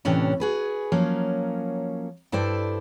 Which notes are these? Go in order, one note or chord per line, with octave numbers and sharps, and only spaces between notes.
A2 C3 E3 C#4 D4
F#4 G#4 B4
F3 F#3 A#3 C#4
G2 E4 A4 C5 D5